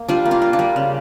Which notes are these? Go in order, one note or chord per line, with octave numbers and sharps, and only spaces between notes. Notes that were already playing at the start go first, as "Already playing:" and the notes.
Already playing: A#3
G3 D4 F4
A#3
D4 F4
A#3
D4
G3
C#3